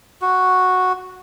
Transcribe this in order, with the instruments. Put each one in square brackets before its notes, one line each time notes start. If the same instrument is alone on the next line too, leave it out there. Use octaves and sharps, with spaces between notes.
[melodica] F#4